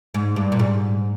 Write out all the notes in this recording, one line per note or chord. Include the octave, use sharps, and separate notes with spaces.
G#2
G2
A#2
G#2